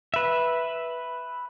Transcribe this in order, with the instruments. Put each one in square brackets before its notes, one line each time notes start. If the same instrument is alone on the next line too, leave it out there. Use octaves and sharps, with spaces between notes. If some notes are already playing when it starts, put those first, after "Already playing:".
[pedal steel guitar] B4 E5